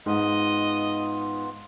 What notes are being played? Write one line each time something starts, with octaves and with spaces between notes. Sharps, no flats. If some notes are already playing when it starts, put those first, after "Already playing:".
G#2 B3 F4 D#5